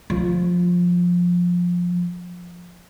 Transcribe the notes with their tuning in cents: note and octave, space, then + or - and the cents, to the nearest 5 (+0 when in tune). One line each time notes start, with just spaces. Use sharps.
F3 +15